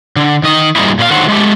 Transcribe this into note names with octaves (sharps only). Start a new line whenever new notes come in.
D3
D#3 D#5
G2 A#2 G3 G#3 D#4 E4
A#2 B4 F5
D3 D#3 F#3 C5 F#5
G#3 A3 G4